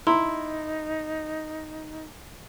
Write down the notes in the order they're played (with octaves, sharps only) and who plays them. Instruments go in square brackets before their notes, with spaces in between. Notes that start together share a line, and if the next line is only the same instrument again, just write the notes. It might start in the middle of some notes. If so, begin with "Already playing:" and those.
[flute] D#4 [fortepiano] E4 [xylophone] A#5 C6